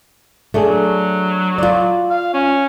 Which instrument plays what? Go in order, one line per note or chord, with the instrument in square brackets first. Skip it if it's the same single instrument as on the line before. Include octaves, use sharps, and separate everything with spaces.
[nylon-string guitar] A3 D4 G#4
[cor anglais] F#3
[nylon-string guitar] F4 D5
[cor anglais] F5
C#4